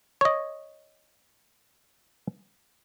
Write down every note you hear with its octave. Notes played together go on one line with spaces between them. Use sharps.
C#5 D#5